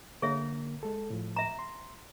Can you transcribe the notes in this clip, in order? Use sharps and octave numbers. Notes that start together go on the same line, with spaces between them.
D3 A#3 G#4 A#4 C#5 E5
G#3 A4
A2 F3
E5 A#5
C6